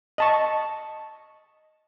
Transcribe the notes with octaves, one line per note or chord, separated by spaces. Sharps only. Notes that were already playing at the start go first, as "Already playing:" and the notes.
D#5 A5 C#6